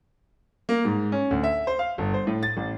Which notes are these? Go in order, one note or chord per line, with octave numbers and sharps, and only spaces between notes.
A#3
G#2
C#4
D2
E5
C5
F5
G1
C5
A2
A6
A1